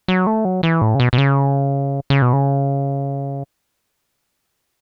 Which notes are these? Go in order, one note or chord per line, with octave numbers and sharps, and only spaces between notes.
F#3
A3
F#3
E3
A2
C#3
B2
B2
C#3
C#3
B2
C#3